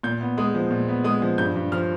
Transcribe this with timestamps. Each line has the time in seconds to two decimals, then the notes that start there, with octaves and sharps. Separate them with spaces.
0.03 A#2 G6
0.21 B3
0.38 G#3 D#6
0.55 F3
0.71 A#2
0.88 B3
1.04 G#3 D#6
1.22 F3
1.38 G2 G6
1.56 G2
1.72 F3 F6